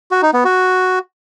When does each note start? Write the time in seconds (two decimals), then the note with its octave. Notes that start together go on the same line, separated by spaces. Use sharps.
0.11 F#4
0.22 D#4
0.34 B3
0.45 F#4